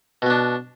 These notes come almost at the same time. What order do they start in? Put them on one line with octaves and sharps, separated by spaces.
B2 B3 D4